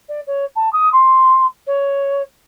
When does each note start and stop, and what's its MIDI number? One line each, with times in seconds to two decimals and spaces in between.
0.08 0.20 74
0.26 0.44 73
0.55 0.71 81
0.72 0.89 87
0.92 1.46 84
1.66 2.22 73